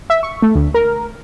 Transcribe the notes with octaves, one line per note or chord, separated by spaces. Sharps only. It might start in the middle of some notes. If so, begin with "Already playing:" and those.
E5
C#6
A3
D2
A#4